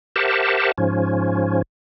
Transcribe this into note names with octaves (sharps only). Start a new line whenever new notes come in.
G4 A#4 C5 E5 F#5 A5
G#2 F3 C#4